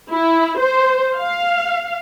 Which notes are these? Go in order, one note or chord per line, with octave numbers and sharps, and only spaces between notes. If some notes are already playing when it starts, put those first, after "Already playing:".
E4
C5
F5